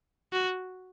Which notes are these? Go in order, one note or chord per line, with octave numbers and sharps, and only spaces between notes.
F#4